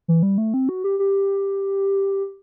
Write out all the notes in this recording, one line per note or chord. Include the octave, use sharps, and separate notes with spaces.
E3
G3
A3
C4
F#4
G4
G4